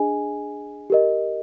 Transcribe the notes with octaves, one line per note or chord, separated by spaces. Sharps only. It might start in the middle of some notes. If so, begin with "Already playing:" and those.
Already playing: D4 G#4 D#5 G#5
G4 A#4 D#5